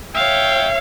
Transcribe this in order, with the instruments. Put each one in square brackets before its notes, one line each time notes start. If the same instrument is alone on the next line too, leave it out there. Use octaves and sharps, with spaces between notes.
[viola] C#5 F5 [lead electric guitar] E5 [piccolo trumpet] G5